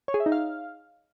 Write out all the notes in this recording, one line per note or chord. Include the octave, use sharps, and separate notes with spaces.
C#5
G#4
E5
D#4
F5